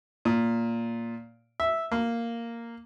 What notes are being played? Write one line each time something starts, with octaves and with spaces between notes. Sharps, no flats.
A#2
E5
A#3